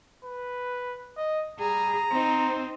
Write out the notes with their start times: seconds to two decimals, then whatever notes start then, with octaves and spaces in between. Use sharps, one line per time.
0.24 B4
1.17 D#5
1.59 G3 G#4 A#5
2.11 C4 D#4 C5